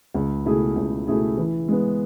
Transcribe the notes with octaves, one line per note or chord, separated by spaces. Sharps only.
C#2
B2 A3 E4 G#4
C#2
B2 A3 E4 G#4
E3
G#3 B3